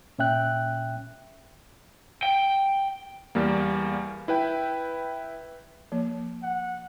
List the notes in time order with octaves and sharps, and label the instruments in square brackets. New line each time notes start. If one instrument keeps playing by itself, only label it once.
[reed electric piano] A#2 C#4 E5 G5 F#6
[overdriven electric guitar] G5
[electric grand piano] E2 G3 A#3
E4 B4 G5
[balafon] F3 A#3
[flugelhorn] F#5